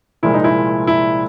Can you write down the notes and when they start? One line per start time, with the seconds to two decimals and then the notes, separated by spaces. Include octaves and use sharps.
0.23 C2 A#2 F3 G#3 E4
0.34 D#4
0.44 E4
0.87 E4